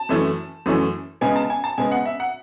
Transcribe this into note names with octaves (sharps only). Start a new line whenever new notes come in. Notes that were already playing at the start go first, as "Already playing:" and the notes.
Already playing: A5
F#2 E3 A3 C#4
F#2 E3 A3 C#4
C#3 G#3 B3 G#5
A5
G#5
A5
C#3 G#3 B3 G#5
F#5
E5
F#5